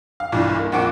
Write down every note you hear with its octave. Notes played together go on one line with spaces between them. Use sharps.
F5
B1 G2 E3 D5
A#3
A#1 F2 F#5 C#6 D6 D7